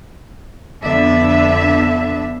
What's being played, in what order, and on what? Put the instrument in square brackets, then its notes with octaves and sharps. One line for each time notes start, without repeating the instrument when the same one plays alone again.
[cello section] F2 D3 B3 D4 E5